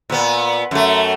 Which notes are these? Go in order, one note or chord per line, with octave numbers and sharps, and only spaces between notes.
A#2 B3
F#2 A3